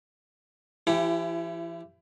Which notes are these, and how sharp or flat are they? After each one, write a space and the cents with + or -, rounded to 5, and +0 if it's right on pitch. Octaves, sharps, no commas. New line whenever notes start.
E3 +45 E4 +25 G4 +0